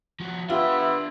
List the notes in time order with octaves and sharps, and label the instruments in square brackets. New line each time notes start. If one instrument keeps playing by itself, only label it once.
[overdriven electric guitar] F3 F#4
[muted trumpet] B3 [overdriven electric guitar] D4 C6 [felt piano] F4 G4 [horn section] E5